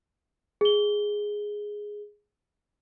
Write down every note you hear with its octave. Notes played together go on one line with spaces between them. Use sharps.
G#4 G7